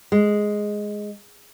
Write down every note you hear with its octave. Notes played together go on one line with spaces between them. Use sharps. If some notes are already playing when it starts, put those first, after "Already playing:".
G#3